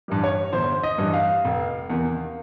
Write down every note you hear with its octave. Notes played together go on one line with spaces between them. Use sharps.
G2 E3 G3
C#5
G1 C5
D#5
G2 E3 G3
F5
F1
E2 C3 D#3